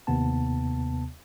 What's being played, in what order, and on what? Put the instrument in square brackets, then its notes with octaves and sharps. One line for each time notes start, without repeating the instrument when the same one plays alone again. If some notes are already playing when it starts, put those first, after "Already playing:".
[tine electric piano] D#2 C3 B3 A5